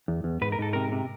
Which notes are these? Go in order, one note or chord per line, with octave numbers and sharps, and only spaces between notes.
E2
E2
G#2 B4
A#4
G#2 A4
C3 A#4
C3